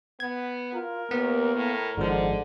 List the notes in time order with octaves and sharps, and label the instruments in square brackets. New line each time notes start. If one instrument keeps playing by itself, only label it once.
[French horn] B3 [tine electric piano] G#6
[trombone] F4 [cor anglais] A#4
[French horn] D#2 [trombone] A#3 [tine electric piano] B3
[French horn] A2
[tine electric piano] G#1 F3 [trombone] G#2 [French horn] D3